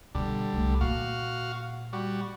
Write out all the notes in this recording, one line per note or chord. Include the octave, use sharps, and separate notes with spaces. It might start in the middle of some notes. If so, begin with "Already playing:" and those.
B2 D3 G3
C2 A3
A#2 F#4 F5
G3 F#4